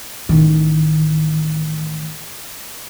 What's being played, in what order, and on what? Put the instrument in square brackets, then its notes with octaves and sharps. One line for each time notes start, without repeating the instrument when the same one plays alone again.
[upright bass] A1 D#3